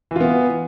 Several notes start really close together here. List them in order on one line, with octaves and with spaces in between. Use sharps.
E3 F4 B3